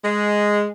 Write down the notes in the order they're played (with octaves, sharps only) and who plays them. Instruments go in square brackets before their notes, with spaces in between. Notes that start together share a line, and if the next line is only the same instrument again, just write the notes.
[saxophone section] G#3